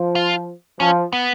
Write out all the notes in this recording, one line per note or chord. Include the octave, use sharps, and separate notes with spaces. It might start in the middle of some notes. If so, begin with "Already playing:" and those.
Already playing: F3
F4
F3 C#4
B3